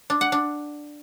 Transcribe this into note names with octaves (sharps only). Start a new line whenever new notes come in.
D4
F#5
D4